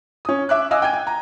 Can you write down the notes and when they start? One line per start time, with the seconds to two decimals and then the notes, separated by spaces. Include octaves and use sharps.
0.25 C#4 D#6
0.49 E5 D6 F#6
0.71 D#5 F5 G#5 D6 E6
0.82 G5 G#5 G#6 D#7
0.93 G5
1.07 A#5